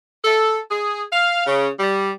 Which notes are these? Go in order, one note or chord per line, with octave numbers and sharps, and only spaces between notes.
A4
G#4
F5
C#3
G3